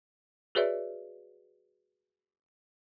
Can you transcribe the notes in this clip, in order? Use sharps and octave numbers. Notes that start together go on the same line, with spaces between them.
F#4 G#4 B4 C#5 D5 E5